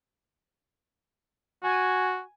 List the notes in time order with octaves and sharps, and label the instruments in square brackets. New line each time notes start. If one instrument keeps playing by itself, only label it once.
[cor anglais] F#4 [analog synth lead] G#5